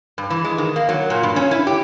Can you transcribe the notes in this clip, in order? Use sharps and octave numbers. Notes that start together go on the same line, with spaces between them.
G2
E3
G#3
D#3
A#3
F#3
A#2
G2
C#4
E4
G4